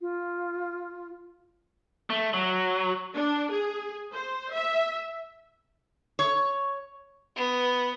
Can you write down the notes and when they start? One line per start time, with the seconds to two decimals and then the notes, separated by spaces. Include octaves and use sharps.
0.01 F4
2.10 A3
2.34 F#3
3.16 D4
3.52 G#4
4.13 C5
4.53 E5
6.19 C#5
7.36 B3